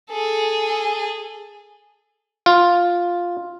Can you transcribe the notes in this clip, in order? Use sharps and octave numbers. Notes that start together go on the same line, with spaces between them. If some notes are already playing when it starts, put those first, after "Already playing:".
G#4 A4
F4